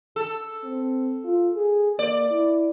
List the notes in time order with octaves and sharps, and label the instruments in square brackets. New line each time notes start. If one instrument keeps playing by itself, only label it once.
[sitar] A4
[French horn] C4
F4
G#4
[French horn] A#3 [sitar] D5
[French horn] E4